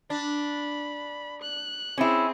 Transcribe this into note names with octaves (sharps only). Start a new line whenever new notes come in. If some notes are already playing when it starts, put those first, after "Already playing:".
D4 B5
F#6
C4 C#4 E4 G#4